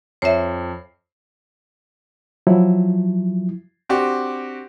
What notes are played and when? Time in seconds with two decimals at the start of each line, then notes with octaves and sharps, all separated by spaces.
0.22 F2 C#5 E5 C7
2.47 F3 F#3 E4
3.89 C4 D4 F#4 G4